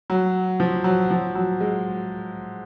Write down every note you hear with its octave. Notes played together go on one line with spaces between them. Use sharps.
F#3
F3
F#3
F3
F#3
G#3